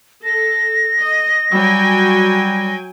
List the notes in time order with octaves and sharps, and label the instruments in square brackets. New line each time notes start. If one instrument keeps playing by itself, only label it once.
[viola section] A4 [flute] A#6
[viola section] D#5
[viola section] F#3 G5 G#5 [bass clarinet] G3